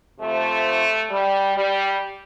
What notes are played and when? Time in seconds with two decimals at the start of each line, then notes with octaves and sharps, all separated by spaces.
0.20 C3 F3 A3
1.11 G3
1.57 G3